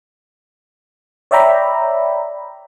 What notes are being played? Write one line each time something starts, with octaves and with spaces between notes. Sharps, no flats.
C#5 D5 E5 G5 A#5 B5